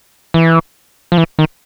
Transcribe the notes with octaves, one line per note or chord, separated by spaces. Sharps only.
E3
F3
E3
D#3